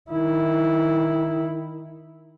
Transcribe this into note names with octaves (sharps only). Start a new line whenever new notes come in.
D#3 E4